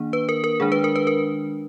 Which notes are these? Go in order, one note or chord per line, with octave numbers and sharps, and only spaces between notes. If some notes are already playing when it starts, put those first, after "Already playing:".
Already playing: D#3 A#3 D4
B4
A#4
A#4
D#3 G#3 D4 G#4
B4
A#4
B4
A#4